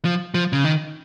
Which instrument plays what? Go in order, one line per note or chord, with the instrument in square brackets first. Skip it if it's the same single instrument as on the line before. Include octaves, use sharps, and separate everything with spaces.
[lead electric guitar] F3
F3
C#3
D#3